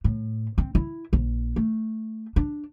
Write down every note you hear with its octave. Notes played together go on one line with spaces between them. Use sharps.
A2
C4
E4
A#1
A3
D4